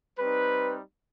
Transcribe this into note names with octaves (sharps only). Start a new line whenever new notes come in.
G3 C4 D#4 B4